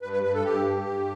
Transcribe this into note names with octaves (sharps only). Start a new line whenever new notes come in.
G2 B4
B4
G2 B4
A4
G2 G4
G2
G2